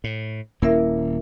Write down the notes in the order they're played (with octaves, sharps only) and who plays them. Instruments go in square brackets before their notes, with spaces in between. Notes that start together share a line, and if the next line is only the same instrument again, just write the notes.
[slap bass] A2
[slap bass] D#1 A#3 C#4 [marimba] E4 A#4 E5